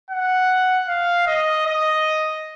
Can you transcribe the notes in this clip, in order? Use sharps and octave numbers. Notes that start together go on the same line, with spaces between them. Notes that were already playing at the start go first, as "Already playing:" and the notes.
F#5
F5
D#5
D#5